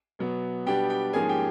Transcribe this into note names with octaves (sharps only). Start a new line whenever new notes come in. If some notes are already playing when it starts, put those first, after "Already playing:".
B2 F#3 B3
B2 G3 B3 D4 G4 G5
G4 G5
G#2 F3 A#3 C#4 G#4 G#5
G4 G5